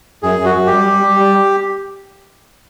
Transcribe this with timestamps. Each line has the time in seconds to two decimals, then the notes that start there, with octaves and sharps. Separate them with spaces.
0.23 F#2 G#4
0.39 F#2
0.45 F#4
0.56 F#2
0.66 G4
0.72 G3
0.88 G3
1.03 G3
1.20 G3